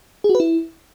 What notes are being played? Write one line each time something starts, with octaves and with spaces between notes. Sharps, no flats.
G#4
F#4
B4
E4